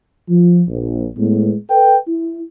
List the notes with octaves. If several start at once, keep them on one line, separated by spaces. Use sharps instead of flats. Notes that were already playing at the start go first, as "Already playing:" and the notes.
F3
A#1
A2 G#3 B3
A4 B4 G5
E4